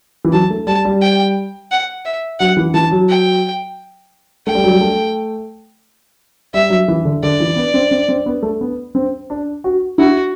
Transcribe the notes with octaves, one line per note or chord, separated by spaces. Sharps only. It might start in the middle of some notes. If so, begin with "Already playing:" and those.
E3
F#3 A5
A3
G3 A5
G3
G5
F#5
E5
F#3 F#5
E3
E3 A5
F#3
G5
A3 G5
G3
F#3
G3
A3
G3 E5
F#3
E3
D3
D3 D5
E3
B3
C4
C4
C4
B3
A3
B3
C4
D4
F#4
E4 F#4